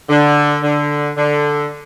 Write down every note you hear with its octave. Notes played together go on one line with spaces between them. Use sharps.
D3
D3
D3